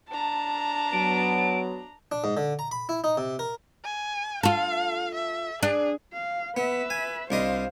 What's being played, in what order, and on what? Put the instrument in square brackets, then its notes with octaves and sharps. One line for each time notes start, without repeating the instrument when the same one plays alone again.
[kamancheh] D4 A#5 [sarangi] A5
[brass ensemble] F#3 B3 [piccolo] D7
[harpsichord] D4
G#2
D3
A#5
B5
E4
D#4
C3
A#4
[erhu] G#5
[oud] F4 A4 [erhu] F5
[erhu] E5
[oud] D4 [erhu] G#4
[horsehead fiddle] F5
[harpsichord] B3 [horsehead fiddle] B4 E5
[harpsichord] G#5
[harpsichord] C2 D4 D#5 [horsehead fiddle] C5 F5